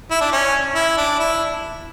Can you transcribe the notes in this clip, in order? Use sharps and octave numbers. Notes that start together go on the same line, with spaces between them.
E4
D4
C#4
E4
D4
E4